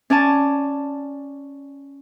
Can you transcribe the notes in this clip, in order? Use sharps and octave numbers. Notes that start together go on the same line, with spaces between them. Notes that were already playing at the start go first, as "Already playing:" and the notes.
C#4 D5 G#5 A5